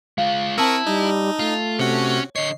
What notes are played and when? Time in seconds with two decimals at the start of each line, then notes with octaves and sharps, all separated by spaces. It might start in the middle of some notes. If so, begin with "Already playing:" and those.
0.18 G#3 F4 F5
0.58 C4 E4 A#4 A5 C#6 D#6 E6
0.87 G3 D#4
1.39 A3 F4
1.79 C3 C#4 F#4
2.36 D3 C#5 D#5 C7